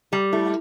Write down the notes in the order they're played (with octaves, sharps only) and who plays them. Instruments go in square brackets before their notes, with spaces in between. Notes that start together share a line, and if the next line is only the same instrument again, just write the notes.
[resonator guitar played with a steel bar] G3 [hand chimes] G4
[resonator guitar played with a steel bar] A3 [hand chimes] E4